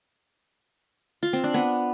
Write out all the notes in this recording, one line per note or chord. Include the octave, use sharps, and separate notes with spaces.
F4
C4
D4
B3